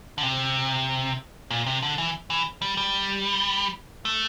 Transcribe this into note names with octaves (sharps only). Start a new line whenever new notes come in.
D3
C3
A#2
C3
D3
E3
E3
G3
G3
A3